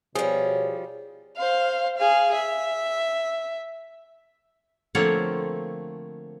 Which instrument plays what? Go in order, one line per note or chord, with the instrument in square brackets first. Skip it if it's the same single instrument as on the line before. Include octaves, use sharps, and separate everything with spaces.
[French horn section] B2 C#5 [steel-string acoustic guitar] F3 G3 [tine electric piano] G#4
[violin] C5 F5
G#4 F5
E5
[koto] D3 F3 A3 A#3 C4 C#5